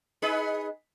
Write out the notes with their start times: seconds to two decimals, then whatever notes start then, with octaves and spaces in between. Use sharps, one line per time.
0.22 D#4 G#4 B4